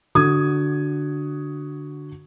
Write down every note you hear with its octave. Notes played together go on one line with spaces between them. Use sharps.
D3 F#4 D#6 G#6